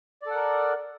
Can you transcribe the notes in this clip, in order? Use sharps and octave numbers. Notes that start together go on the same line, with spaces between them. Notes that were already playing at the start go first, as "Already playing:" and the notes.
A4 A#4 D5 F#5